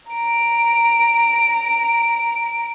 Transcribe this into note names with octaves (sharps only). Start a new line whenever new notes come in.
A#5 D7